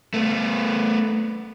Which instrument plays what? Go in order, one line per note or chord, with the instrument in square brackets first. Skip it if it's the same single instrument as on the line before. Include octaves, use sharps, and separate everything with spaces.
[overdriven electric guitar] A3 B3